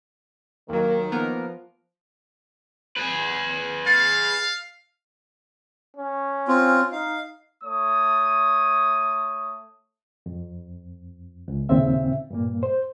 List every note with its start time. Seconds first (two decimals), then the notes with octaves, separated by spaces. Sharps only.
0.69 D#2 D#3 F#3 A#3
1.12 F3 A#3 B3 A#4
2.97 G#4 B4
3.86 F5 A6 C#7
5.97 C#4
6.48 C4 F4
6.92 D#4 F5
7.64 A3 C#5 D#6
10.26 F2
11.48 C#2
11.69 D#2 A#2 C#3 C4 E5
12.31 G2 A#2 A#3
12.63 C5